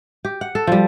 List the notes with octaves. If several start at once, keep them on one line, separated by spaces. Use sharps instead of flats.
G4
F#5
A4
F3 G3